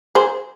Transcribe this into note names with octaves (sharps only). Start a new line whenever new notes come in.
G#4 C5